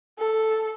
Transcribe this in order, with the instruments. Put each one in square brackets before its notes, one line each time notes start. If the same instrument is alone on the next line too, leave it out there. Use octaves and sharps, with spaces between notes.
[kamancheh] A4